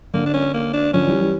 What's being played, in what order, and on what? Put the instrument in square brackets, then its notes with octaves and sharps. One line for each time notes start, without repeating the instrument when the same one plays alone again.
[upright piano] D3 [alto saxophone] A#3
[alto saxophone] D4
C#4
A#3
D4
[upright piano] D3 F3 [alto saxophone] C#4
[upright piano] E3 G3
E3 G3